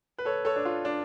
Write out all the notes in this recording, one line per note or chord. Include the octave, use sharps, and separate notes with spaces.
B4
A4 C#5
A4 C#5
D4
F4
D4